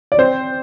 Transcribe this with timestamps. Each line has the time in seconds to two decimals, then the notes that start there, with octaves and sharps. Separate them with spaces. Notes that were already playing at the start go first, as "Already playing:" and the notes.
0.12 D5
0.18 C4 C5